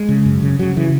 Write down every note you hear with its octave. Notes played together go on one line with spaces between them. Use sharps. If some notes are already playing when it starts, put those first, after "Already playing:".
Already playing: G#3
C#3
F#2
C#3
C#3 F#3
C#3 E3